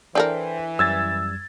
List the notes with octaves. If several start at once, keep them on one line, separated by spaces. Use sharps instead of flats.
E3 D4 A4 A#4 C5 G5 C6
F#2 G3 E6 G#6 A6